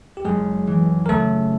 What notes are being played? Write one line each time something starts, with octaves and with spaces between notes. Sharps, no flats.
G4
F#1 G#3 G#4
E3
A#4
C#3 A3 A4